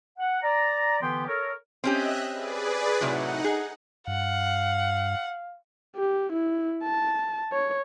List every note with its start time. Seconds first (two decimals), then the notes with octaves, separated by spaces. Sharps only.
0.18 F#5
0.42 D5 A#5
1.02 D3 E3 B3 G4 G5 C6
1.27 A4 A#4 C#5
1.84 C4 C#4 G4 D#5 E5 F#6
2.32 G#4 B4 D5
3.01 A2 C3 F#3 D#4 F#5
3.44 G#4
4.07 G2 F5 F#5
5.96 G4
6.32 E4
6.84 A5
7.52 C#5